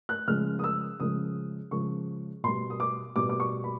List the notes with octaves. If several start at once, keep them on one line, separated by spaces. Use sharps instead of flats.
F#6
C#3 F3 G#3 F6
D#6
E6
C#3 F3 G#3 D#6
C#3 F3 G#3 C#6
B2 G3 C6
D#6
D6
B2 G3 D6
D6
C#6
B5